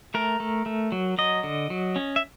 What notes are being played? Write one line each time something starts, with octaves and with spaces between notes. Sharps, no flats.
A3 A#4
A3
A3
F#3
F#3 D#5
D3
F#3
C#4
E5